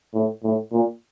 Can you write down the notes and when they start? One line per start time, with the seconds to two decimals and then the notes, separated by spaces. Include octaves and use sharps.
0.13 A2
0.43 A2
0.72 A#2